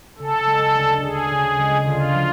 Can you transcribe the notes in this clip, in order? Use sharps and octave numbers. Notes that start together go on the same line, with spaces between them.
C#3 A4
G#3
D2
D2 G#4
C#3
G#3
D3 F4
F3